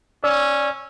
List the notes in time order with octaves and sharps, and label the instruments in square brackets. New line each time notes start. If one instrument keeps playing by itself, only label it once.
[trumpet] C#4 [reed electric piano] D5 E6